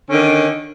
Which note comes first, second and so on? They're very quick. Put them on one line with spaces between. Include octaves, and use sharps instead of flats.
C#4 D3 D#3